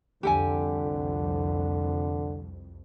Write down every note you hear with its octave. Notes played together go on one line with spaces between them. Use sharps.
C2 F2 D3 G4 A4 G#5